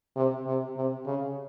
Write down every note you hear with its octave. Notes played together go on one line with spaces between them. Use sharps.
C3
C3
C3
C#3